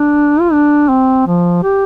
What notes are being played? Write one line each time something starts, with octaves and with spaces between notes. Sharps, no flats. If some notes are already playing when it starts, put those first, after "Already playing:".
Already playing: D4
F4
D4
C4
F3
G4